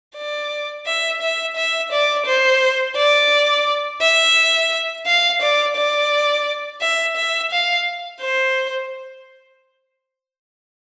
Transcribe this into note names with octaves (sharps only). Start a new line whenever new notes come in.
D5
E5
E5
E5
D5
C5
D5
E5
F5
D5
D5
E5
E5
F5
C5